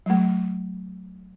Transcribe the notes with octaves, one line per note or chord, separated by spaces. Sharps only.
F#3 A3